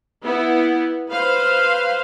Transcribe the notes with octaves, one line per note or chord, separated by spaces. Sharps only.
B3 E4
B4 C5 F5